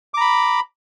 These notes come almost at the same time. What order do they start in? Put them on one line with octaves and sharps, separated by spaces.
D6 A#5 B5